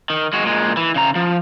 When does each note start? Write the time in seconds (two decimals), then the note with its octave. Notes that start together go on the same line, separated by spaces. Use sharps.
0.10 D#3
0.33 G#3 F#4
0.45 A#2 G#3
0.77 E3
0.95 C#3 A#5
1.15 F3